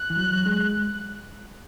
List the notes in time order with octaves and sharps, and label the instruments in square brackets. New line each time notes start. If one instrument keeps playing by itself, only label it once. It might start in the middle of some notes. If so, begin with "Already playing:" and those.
Already playing: [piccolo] F#6
[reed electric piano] E3
F#3
G#3